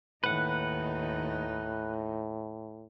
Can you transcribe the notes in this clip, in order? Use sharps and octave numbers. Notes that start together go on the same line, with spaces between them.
D#2 A2 D#4 B4 F#5